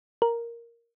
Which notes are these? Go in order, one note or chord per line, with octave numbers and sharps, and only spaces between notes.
A#4